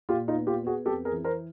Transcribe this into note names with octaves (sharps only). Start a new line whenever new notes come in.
A#2 F4 G4
D#4 F4
B3
F4 G4
B3
F#4 G#4
F2 G4 A4
G#4 A#4
E3
A#4 C5